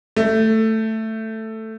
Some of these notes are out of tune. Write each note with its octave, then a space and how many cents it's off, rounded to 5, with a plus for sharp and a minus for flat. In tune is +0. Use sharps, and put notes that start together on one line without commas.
A3 +10